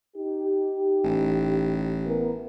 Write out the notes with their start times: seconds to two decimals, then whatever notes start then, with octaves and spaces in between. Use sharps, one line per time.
0.16 D#4 G4
1.04 A1
2.07 E3 B3 A#4